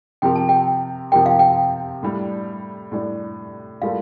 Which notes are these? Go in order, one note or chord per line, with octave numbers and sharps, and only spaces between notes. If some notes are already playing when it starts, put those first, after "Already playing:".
C3 F3 C4 G4 A#4 G5
A5
G5
C3 F3 C4 G4 A#4 G5
F5
G5
A2 G3 D4
A2 G3 D4
A2 G3 A#3 F4 A4 F5